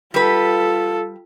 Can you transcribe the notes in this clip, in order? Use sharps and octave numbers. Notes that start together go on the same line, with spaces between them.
G3 F4 A4 B4